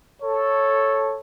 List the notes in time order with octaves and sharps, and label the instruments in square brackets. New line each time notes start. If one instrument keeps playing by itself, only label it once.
[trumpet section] A4 C#5